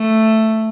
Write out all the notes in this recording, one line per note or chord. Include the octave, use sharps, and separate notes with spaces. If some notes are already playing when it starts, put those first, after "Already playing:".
Already playing: A3